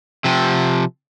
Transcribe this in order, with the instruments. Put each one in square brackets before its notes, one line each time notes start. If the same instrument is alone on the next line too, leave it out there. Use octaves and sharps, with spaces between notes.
[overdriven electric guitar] C3 F3